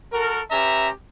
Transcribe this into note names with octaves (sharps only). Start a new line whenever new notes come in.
F#4 A4 A#4
C#4 G4 B4 E5 A#5